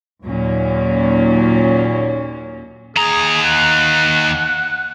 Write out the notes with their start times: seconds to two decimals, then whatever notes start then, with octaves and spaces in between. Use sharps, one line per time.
0.24 D#2 A#2 F#3 C#4
2.97 D#2 G#4 A#5
3.43 F#5